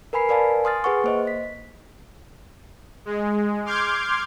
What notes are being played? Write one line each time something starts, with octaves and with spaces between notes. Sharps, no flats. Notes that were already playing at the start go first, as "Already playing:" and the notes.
A#4 B4 G#5 B5 C7
A#4 B4 D5 F5 G#5 A5
G#5 C6 D#6 F6 A6
G#4 B4 F#5 C#6
A#3 C5 D#5
B6
G#3
C6 D6 F6 G6 G#6